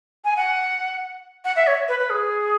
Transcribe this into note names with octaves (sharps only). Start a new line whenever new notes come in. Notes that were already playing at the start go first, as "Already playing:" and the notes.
G#5
F#5
F#5
E5
C#5
B4
B4
G#4